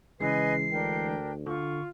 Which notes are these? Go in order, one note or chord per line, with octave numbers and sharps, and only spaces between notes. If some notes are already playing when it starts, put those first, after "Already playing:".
C#3 E3 G#3 B4 D#5 G#5 C7
D2 D4 A#4 G5
D3 F4 C#6